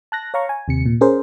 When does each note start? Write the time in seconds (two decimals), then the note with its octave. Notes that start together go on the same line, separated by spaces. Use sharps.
0.12 A5 F#6 A#6
0.34 C#5 F5 A#5 C#6
0.49 G#5
0.68 D#2 C3 C#7
0.86 A#2
1.01 C#4 G#4 A#4 C5